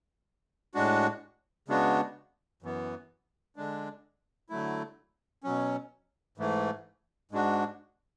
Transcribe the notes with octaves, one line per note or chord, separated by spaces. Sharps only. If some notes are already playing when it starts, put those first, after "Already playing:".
A2 G#3 D4 F#4
C#3 G#3 B3 D4 F#4
F#2 E3 B3
D3 G#3 D4
D3 F#3 A3 E4
B2 F#3 C#4
G#2 E3 A3
G#2 G#3 D4 F#4